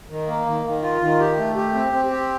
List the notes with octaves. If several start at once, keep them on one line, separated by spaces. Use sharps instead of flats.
D#3
A#3
D#3
D#3
F4
D#3
G4
A3
G4
C4
C4
G4